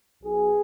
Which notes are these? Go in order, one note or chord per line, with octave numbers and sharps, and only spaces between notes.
B1 B2 B3 G#4